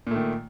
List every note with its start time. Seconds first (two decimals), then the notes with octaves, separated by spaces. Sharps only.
0.07 A#2
0.11 A3
0.16 D#3